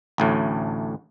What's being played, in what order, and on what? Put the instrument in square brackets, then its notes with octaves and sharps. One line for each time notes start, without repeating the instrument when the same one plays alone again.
[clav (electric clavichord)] A1 D2 A2